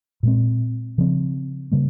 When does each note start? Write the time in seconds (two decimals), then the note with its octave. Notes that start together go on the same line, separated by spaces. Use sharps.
0.23 A#2 G#3 C4
0.98 C#3 F3 C4
1.72 C#3 G3 A#3